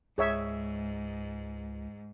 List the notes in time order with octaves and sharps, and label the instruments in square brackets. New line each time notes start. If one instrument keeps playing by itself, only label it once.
[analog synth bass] C#2 [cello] G#2 [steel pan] G#4 C#5 E5